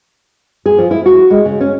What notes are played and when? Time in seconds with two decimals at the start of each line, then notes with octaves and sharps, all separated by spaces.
0.66 G#4
0.78 F3
0.91 E4
1.06 F#4
1.30 G#3
1.45 C#3
1.61 C#4